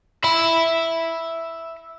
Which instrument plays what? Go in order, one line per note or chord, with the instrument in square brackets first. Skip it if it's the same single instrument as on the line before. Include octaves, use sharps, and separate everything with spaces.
[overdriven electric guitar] E5 B5